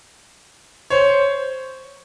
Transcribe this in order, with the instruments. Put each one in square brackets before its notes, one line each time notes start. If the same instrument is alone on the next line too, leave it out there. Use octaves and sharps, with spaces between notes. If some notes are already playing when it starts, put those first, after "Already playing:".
[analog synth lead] C5 [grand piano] C#5